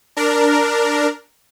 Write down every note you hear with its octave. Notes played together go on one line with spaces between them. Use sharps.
D4 A#4